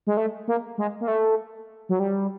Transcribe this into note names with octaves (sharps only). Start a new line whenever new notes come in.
G#3
A3
A#3
G#3
A#3
A3
F#3
G3